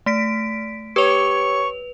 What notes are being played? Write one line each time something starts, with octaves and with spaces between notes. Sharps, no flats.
A3 B6 D7
G4 B4 C#5 C#6 F7